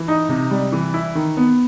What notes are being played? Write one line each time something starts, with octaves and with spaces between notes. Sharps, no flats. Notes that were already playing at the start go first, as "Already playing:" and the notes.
Already playing: E3
D#4
C3
G3
E3
E4
D#3
B3